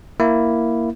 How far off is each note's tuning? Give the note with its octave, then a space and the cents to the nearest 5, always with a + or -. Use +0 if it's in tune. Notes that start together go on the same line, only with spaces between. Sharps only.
A#3 +0 E4 +0